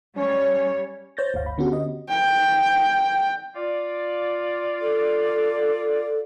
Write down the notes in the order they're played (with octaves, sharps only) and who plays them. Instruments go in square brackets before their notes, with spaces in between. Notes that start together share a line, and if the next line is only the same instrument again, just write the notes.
[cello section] G3 C#5 [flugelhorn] C#4
[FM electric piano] C5 C#5 G6 A6 A#6
G1 D2 F5
B5
D3 B3 C#4 F#4 G4
D#5
[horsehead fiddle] G5
[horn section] F4 D5
[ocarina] A4